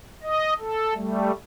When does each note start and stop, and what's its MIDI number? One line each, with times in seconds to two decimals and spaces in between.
0.22 0.54 75
0.59 0.94 69
0.94 1.32 55
0.94 1.32 57